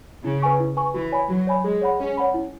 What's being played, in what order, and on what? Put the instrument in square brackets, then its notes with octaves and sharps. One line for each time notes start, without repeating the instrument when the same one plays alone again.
[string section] C#3 [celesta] E4
[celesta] B4 G#5 C#6
E4
B4 G#5 C#6
[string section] E3 [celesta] F#4
[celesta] C#5 G#5 B5
[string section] F#3 [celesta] F#4
[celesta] C#5 G#5 B5
[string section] G#3 [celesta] G#4
[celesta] C#5 F#5 B5
[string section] C#4 [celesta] G#4
[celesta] C#5 F#5 B5
E4